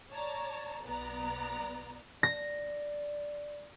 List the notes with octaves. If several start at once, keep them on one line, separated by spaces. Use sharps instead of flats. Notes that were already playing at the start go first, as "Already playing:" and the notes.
C#5 D5 A5 A#5
B1 B3 D5 A#5
D5 A#6